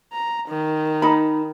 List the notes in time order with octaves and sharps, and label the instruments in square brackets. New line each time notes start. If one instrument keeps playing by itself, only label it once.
[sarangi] A#5
D#3
[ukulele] D#4 B5